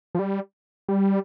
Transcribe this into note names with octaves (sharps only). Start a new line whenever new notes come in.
F3
G3
G3